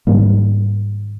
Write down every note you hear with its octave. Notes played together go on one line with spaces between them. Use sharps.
G#2 D#3 G3 A#3